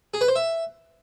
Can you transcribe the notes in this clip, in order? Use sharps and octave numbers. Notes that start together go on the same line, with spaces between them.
G#4
B4
C5
E5